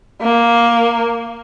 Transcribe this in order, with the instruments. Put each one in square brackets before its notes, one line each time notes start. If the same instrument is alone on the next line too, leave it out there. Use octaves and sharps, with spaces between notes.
[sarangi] A#3